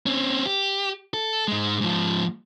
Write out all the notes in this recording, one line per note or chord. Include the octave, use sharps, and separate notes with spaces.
C4 C#4
G4
A4
G#2 G#3
G#2 F3